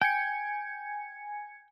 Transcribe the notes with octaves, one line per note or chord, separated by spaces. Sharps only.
G5 G#5 G#6 C#7